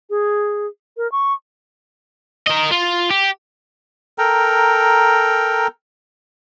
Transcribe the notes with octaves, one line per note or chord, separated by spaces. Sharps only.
G#4
A#4
C#6
A#4 D#5
F4
G4
A4 A#4 G5 A#5